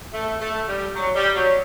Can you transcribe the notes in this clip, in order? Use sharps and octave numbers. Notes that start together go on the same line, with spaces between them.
A3
A3
G3
F#3
G3
F#3